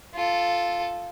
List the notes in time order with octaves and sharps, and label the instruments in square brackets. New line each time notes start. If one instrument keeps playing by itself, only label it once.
[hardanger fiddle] F4 A4